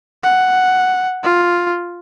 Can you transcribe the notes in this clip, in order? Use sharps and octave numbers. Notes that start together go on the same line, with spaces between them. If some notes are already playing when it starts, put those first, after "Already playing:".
F#5
F4